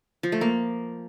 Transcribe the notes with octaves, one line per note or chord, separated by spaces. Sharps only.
F3
A3
A#3